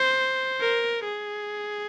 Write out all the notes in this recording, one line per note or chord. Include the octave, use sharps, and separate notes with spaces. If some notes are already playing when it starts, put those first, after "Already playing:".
Already playing: C5
A#4
G#4